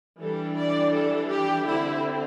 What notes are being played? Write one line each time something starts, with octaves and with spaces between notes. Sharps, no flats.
E3 G3 D4 A4
D5
A4
G4
D3 C4 E4